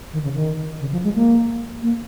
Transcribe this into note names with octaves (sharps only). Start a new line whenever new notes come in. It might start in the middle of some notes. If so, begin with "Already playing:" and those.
D#3
C#3
D#3
C#3
F3
G#3
A#3
A#3